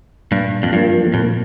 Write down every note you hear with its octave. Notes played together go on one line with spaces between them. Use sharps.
G2 A#2
F2
G2 F3 A#3
F2 A#2